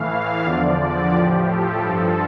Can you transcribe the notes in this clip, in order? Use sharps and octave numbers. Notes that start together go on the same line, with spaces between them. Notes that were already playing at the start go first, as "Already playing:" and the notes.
Already playing: A2 E3 F5
E2 D3 F3 D5
A2 F3 G4
A4
G2 F3 A4